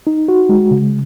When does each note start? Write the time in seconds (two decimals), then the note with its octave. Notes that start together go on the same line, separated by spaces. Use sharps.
0.07 D#4
0.28 F#4
0.49 G#3
0.71 C#3